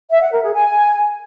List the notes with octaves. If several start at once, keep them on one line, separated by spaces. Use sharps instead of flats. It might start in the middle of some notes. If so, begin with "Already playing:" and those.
E5
F#5
A#4
G#4
G#5